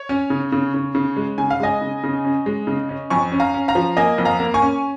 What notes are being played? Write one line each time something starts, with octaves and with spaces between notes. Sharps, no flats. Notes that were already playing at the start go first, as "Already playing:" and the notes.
Already playing: C#5
C#4
C#3
C#3
C#3
C#3
G#3
C#3 G#5
F5
G#3 D#5 G#5
C#3
C#3
C#4
G#3
C#3
C#4
F2 G#5 C#6
C#4
F5 A#5
C#4
F5 A#5
F3
A#3 D#5 G#5
F2
F5 A#5
A#3
G#5 C#6
C#4